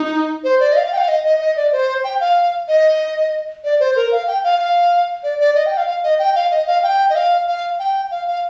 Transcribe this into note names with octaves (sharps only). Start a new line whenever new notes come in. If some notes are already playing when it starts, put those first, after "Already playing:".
Already playing: D#4
C5
D5
D#5
F5
F5
G5
F5
D#5
D#5
D#5
D5
C5
G5
F5
D#5
D5
C5
A#4
F5
G5
F5
F5
D5
D5
D#5
G5
F5
F5
D#5
G5
F5
D#5
F5
G5
D#5
F5
F5
G5
F5
F5